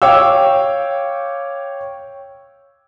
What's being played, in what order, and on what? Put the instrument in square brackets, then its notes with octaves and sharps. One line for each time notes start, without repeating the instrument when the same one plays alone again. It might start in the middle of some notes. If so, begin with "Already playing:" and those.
[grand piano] C#5 F5 G5 D6 E6